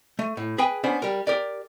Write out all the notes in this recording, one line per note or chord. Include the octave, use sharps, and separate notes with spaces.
A3
A2
G#4 B4 G5 G#5
B3 C#4 D4 C5
G3 A#4
G4 A#4 D5